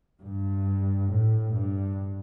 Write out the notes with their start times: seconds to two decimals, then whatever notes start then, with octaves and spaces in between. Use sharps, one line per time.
0.22 G2
1.09 A2
1.53 G2